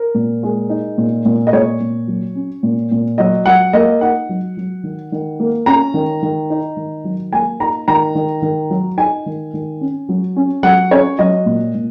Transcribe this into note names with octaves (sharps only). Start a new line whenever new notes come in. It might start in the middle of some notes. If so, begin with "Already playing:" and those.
Already playing: A#4
A#2
G#3
D#4
A#2
A#2
D#5
A#2 C#5
A#2
F#3
C#4
A#2
A#2
F#3 D#5
F#3 F#5
A#3 D#5
D#4 F#5
F#3
F#3
D#3
D#3
A#3
C#4 A#5
D#3
D#3
D#4
D#3
F#3
A#3 G#5
D#4 A#5
D#3 A#5
D#3
D#3
F#3
D#4 G#5
D#3
D#3
C#4
F#3
C#4
F#3 F#5
C#4 C#5
F#3 D#5
A#2
A#2